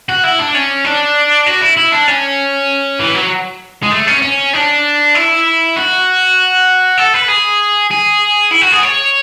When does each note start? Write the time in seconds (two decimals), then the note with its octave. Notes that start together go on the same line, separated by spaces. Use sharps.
0.09 F#4
0.24 E4
0.39 D4
0.54 C#4
0.84 D4
1.47 F#4
1.62 E4
1.77 E4
1.92 D4
2.08 C#4
3.00 E3
3.15 F#3
3.83 G#3
3.91 A3
4.07 C#4
4.22 C#4
4.54 D4
5.15 E4
5.76 F#4
6.98 A4
7.14 B4
7.28 G#4
7.91 G#4
8.51 E4
8.62 F#4
8.72 G#4
8.83 C#5